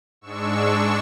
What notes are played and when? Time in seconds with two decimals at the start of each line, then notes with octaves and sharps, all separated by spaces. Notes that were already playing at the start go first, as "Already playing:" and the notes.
0.21 G#2 G#3 D4 C#6 E6